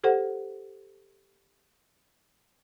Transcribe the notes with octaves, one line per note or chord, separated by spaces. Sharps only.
G4 A4 C5 F#5